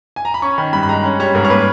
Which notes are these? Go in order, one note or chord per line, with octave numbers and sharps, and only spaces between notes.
G#5
A#5
B5
C#4 C#6
D#3 B5
G2 B5
B5
G#3 A#5
C#4
G3 C#5
G#2 A#4
C#5
A#3 B4